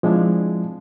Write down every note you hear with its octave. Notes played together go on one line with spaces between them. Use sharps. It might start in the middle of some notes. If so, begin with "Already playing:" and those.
F3 G#3 C4 D4 E4